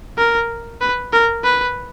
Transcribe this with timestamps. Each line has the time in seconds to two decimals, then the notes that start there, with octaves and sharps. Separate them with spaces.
0.18 A#4
0.81 B4
1.13 A#4
1.44 B4